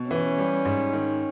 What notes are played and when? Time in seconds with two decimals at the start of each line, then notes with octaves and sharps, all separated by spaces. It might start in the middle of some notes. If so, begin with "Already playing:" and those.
Already playing: B2
0.10 E3 C#4
0.38 G3
0.65 G#2
0.93 D#3